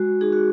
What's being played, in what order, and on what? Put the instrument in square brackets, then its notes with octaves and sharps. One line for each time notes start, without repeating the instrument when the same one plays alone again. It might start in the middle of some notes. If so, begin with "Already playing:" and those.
Already playing: [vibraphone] G#3 F#4
D#4 F#4 G#4
F#4